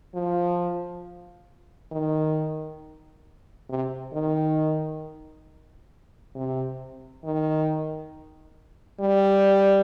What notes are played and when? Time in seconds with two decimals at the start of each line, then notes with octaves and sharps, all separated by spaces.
0.14 F3
1.91 D#3
3.69 C3
4.13 D#3
6.35 C3
7.24 D#3
9.01 G3